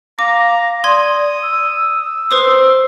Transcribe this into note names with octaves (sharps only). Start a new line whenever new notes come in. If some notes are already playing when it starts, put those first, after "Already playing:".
F5 A#5 D6
D5 C6 D#6 G#6
E6
B4 C5 C6 D#6